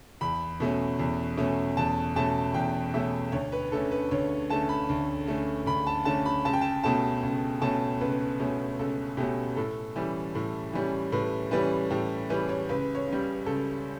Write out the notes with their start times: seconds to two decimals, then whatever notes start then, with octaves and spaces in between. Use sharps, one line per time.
0.21 E2 B5
0.60 B2 A3 C#4
0.99 E2
1.37 B2 A3 C#4
1.77 E2 A5
2.16 B2 A3 C#4 A5
2.54 E2 G5
2.94 B2 A3 C#4 E5
3.32 D2 C#5
3.52 B4
3.72 D3 A3 C#4 A4
3.91 B4
4.11 D2 C#5
4.50 D3 A3 C#4 A5
4.69 B5
4.89 D2
5.28 D3 A3 C#4
5.66 D2 B5
5.87 A5
6.05 D3 A3 C#4 A5
6.26 B5
6.45 C#2 A5
6.53 G5
6.61 A5
6.83 B2 A3 C#4 A5
7.23 C#2
7.61 B2 A3 C#4 A5
8.01 C#2 B4
8.40 B2 A3 C#4
8.79 C#2 A4
9.17 B2 A3 C#4 G4
9.56 A2 A4
9.96 E3 G3 C#4
10.35 A2
10.73 E3 G3 C#4
11.12 A2 B4
11.51 E3 G3 C#4 B4
11.90 A2 G4
12.30 E3 G3 C#4 B4
12.49 C#5
12.69 C#2 B4
12.95 C#5
13.08 C#3
13.13 G3
13.46 C#2 A4